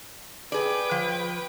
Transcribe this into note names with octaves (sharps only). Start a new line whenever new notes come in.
G#4 B4 D5 G5
F3